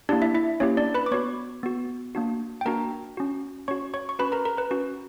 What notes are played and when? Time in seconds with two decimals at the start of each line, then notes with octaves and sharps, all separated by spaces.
0.09 A#3 D4 E4 G4 D5
0.22 E4 E5
0.34 E4 E5
0.60 A#3 C#4 E4 G4 C#5
0.77 D4 D5
0.94 B4 B5
1.06 D6
1.11 B3 F#4 C#5 C#6
1.63 B3 F#4
2.15 A#3 D4 F#4
2.61 G5
2.65 A#3 D4 F#4 A#4 A#5
3.17 C#4 F#4
3.68 C#4 F#4 C#5 C#6
3.94 C#5 C#6
4.09 C#6
4.19 C#4 F#4 B4 B5
4.32 A#4 A#5
4.45 A#4 A#5
4.57 B4 B5
4.71 C#4 F#4